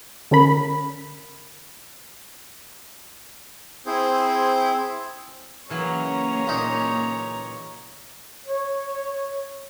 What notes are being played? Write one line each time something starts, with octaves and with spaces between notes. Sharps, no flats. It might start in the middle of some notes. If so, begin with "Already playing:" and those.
D3 C#4 A#4 B5
C4 E4 G#4 C5
C#3 E3 F#3 A#3 C#4 C#5 A#5
A#2 D#4
C#5